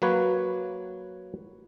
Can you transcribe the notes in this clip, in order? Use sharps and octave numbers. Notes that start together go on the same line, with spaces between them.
F#3 A#3 B4 C#5